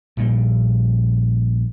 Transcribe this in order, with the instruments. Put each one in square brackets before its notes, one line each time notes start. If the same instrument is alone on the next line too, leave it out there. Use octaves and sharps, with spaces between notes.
[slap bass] A#1 A#2 E3 G3